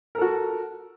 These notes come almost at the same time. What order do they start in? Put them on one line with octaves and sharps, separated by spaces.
A#4 A4 F#4